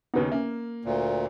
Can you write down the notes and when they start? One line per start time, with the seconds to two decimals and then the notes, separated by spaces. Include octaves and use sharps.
0.14 D#2 C#3 B3 D#4 B4
0.32 A#3 C#4 E5
0.85 D2 A#2